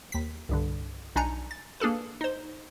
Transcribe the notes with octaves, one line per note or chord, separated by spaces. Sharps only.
D#2 B6
C2 G2 D3
B1 D4 D#4 G#5 A#5 C#7
A6
A#3 D4 G#4 A4 B4
D#4 C5